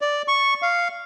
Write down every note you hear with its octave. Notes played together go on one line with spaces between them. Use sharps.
D5
C#6
F5